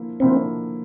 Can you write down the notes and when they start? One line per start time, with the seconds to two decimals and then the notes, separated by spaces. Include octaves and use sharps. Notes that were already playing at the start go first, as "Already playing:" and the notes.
Already playing: D3 F3 A#3 E4
0.20 D3 F3 A#3 C4 E4